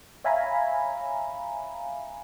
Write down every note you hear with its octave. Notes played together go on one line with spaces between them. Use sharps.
C#5 E5 F5 G#5 A#5 B5